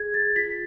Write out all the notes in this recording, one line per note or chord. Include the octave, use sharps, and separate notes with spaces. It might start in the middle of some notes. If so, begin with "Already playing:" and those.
Already playing: G#4 G#6
G#4 A6
F4 B6